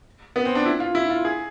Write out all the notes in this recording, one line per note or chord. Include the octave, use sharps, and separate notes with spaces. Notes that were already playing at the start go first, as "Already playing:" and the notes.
B3
C4
D4
E4
F4
E4
F4
G#4